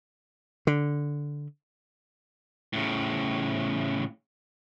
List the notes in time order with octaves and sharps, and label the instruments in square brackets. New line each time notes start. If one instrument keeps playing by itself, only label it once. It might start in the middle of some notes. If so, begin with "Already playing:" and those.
[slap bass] D3
[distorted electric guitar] A2 C#3